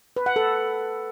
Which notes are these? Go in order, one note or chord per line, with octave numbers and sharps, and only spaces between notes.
B4
F#5
A4